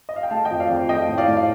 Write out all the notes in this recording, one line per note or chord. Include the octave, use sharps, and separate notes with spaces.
D#5
F5
G5
A3 F5 A5
D#5 G5
F2
D5 F5
F2
A3 D#5 G5
A2
D5 F5
A2
F5